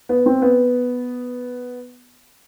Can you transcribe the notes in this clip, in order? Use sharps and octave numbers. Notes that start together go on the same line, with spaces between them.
B3
C4
B3